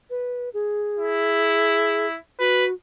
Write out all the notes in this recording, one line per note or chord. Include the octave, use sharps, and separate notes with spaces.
B4
G#4
E4
F#4 B4